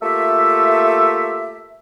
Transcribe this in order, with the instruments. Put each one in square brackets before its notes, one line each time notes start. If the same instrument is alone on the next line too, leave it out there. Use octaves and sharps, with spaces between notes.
[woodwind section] A3 A#3 F4 G4 E5